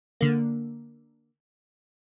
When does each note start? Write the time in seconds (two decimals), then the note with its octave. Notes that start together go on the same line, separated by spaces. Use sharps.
0.21 D3 A#3